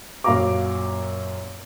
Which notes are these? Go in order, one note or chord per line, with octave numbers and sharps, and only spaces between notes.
F#2 A#2 F#4 F5 A#5 D6